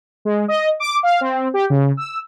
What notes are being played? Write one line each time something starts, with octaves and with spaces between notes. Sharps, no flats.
G#3
D#5
D6
F5
C4
G4
C#3
E6